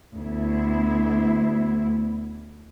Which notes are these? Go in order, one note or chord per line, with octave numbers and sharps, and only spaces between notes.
D2 B3 E4